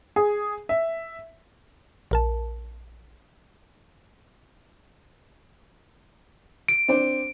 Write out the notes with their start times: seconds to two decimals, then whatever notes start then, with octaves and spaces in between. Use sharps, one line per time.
0.16 G#4
0.69 E5
2.11 A#1 A#4 A5
6.69 D7
6.88 C4 D4 C5